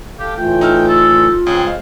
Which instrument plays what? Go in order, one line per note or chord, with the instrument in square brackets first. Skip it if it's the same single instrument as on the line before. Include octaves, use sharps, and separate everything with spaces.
[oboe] G4 [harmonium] A4 F5
[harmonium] A2 E3 A3 [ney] F4 [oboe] G5
[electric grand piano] D#4 E6 F6
[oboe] A4
[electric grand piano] C#2 [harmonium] C4 C#5 [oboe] G#4
[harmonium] F#2 G#3 [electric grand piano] C5 F5